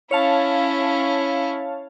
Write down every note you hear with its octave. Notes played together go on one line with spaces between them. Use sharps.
C#4 E4 C#5 F5 A5